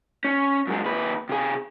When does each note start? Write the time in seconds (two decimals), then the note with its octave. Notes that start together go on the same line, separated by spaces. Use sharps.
0.25 C#4
0.67 F#2 G#3
0.85 D#2 B4
1.29 C3 G#4